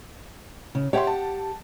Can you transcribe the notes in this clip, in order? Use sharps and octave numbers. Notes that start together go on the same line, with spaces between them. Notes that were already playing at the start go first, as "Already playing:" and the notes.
C#3
G4 C#5 E5 F#5 C6
A5